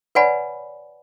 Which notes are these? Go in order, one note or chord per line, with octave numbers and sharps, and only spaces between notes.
B4 C#5 D5 F#5 G#5 B5